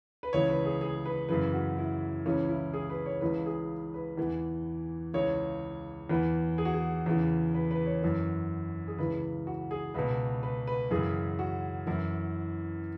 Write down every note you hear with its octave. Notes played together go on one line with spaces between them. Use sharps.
B4
C#2 C#3 E3 C#5
B4
G#4
G#4
B4
F#2 C#3 E3 B4
F#4
E4
C#2 C#3 E3 C#4
E4
G#4
B4
C#5
C#2 C#3 E3 B4
G#4
B4
E2 E3
C#2 C#3 E3 C#5
E2 E3 B4
G#4
F#4
G#4
E2 C#3 E3
B4
B4
C#5
F#2 E3
G#4
C#2 C#3 E3 B4
F#4
G#4
C#2 B2 B4
B4
B4
F#2 C#3 E3 G#4
F#4
F#2 E3 E4